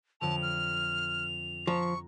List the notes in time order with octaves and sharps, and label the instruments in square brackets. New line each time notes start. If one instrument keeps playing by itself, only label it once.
[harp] F2 D3 [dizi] A5 [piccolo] F7
[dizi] F6
[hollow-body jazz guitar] F3 [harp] A#5 [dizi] C#6